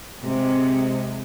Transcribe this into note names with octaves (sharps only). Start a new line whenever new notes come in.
C3 G#3